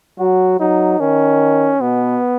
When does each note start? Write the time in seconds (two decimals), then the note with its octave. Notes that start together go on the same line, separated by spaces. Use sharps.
0.19 F#3 F#4
0.60 F#3 D#4
1.00 D#3 C#4
1.81 B2 B3